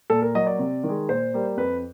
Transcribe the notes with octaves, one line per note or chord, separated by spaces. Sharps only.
A#2 A4
A#4
F#3 A#3 D#5
D5
C3
D#3 G#3
A#2 C5
G3 A#3
F2 B4